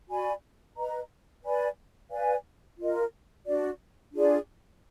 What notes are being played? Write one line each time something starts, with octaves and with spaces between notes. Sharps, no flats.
F#4 D5 G#5 B5
B4 D#5 A#5
B4 D5 G#5 B5
B4 D5 F5 G#5
F4 A#4 D#5
D4 F#4 D5
D4 F4 G#4 D5